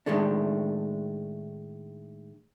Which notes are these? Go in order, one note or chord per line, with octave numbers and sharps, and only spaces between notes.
A2 D#3 G#3 A3 D4